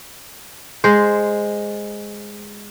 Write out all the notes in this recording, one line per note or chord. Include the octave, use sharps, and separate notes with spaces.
G#3 C5